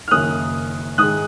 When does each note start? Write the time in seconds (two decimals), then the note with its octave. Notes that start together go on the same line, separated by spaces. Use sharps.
0.08 F6
0.11 F#1 F#2 D#3 A#3 C#4 D#6 F#6
0.98 G#2 D#3 G#3 D#6 F#6